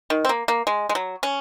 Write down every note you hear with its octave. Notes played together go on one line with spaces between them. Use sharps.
D#3
C4
A#3
A#3
G#3
G#3
F#3
C#4